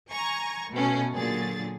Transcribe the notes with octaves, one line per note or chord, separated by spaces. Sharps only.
G#5 A#5 C#6
B2 A3 C#4
A#2 D3 F#3 G#4 A6